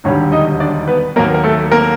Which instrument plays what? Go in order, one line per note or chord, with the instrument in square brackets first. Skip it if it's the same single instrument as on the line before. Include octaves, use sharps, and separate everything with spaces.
[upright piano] E1 D#2 D3 G3 C#4 C#5
D#4 D#5
D4 D5
B3 B4
D#2 D#3 F#3 A#3 A#4
A#4
A3 A4
A#3 A#4